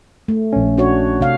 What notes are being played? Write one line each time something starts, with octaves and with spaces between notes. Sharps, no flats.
A3
A#1 C#4
D4 F#4 C#5
C3 F5